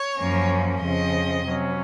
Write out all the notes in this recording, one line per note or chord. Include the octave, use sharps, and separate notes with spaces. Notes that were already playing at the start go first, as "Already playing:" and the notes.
Already playing: C#5
F#2 F3 A#3 C#4
F2 C#3 F3 D#5
C3 F#3 C#4